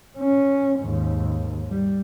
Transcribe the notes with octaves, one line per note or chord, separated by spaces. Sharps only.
C#4
D#2 G#2
G3